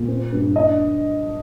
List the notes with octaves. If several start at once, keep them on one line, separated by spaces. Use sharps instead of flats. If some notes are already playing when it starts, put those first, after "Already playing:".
Already playing: A#2
C4
G2
D4 D#5